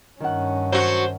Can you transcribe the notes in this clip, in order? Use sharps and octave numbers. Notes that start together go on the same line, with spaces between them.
G2 D#3 C#4 F#5
F#3 F#4 C5